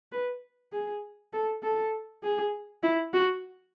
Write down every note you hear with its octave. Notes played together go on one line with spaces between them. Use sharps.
B4
G#4
A4
A4
G#4
E4
F#4